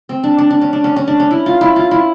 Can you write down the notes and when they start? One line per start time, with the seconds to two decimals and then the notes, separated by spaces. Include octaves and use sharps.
0.09 C4
0.24 D4
0.38 D4
0.51 D4
0.61 C#4
0.73 D4
0.84 C#4
0.96 C#4
1.08 D4
1.20 C#4
1.31 E4
1.46 F4
1.61 E4
1.76 F4
1.91 E4